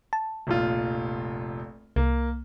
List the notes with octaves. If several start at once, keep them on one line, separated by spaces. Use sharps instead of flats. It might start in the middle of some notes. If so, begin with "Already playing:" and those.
A5
F1 A#1 F4
C2 A#3